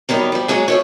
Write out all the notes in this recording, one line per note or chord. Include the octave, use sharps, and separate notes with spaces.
D#3 F#3 G3 B3
F3 G3
F#3 G#3 A#3 G#4 C#5
F3 A3 C#5